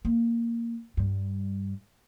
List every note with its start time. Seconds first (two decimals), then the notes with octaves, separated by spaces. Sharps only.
0.05 A#3
0.97 G2 G3